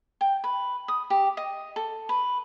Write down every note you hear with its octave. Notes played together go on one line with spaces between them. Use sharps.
G5
B4
D#6
G4
D#5
A4
B4